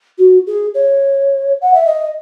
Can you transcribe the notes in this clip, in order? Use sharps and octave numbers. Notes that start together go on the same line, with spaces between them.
F#4
G#4
C#5
F#5
E5
D#5